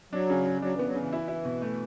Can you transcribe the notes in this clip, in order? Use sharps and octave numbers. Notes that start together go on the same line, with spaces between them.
F#3 D4
C#3
C#3
F#3 D4
E3 B3
F#3
C#3 E3
E4
E4
B2
A3